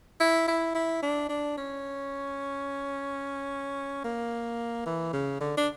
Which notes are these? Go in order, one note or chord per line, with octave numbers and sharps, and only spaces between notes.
E4
E4
E4
D4
D4
C#4
A#3
E3
C#3
D3
D4